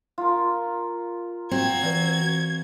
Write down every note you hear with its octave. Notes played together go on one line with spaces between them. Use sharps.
F4 A#4
C4 F#4 G#6
E3 B4